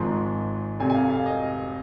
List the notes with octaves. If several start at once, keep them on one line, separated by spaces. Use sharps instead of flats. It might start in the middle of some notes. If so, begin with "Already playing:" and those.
Already playing: G#1 G#2 F3 G#3 C6
F1 F2 C3 G#5
G#5
F5
F5
D#5